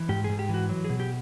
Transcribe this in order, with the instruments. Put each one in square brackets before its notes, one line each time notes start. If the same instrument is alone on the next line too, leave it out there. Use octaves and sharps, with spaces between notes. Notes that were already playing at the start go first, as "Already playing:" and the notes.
Already playing: [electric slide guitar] E3
G#2 G4
G#2 G#4
G4
E3 F#4
F#3
B2 G#4
G4